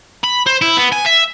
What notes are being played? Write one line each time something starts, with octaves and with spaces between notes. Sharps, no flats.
B5
C5
E4
B3
G#5
E5